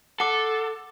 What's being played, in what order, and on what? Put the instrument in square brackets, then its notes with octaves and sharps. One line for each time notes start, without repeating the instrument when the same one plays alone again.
[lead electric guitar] A4 [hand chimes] F#5 D6